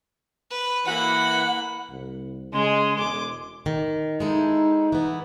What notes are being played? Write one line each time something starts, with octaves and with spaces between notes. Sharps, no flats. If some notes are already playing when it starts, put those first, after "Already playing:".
B4
E3 A#3 F#5 B5
C2
C#3 G#3 G#4 C6
E1 D6
D#3
G#3 D#4 E4 A4
E3 B3